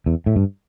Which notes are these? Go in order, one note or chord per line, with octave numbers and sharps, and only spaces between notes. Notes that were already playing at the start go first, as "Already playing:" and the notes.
E2
A2
G2